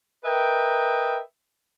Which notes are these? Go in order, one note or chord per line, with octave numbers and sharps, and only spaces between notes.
A#4 B4 D#5 E5 G5